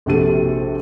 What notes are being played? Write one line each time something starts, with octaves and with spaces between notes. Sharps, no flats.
A#1 C3 F#4 G4 A4 D#7